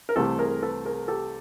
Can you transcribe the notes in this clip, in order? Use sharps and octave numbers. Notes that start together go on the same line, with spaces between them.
A#4
C2 C3 E3 A3 G4 A4
G#4 A#4
A4 B4
G#4 A#4
G4 A4